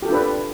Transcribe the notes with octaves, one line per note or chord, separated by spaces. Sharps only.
D4 F4 G4 A4 B4